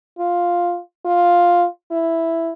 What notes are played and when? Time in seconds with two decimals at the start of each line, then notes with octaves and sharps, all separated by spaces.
0.18 F4
1.05 F4
1.91 E4